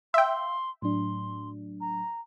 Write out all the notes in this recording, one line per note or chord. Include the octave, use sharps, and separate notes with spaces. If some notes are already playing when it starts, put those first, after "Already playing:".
E5 F5 G5 C6
A2 F#3 D4 C6
A#5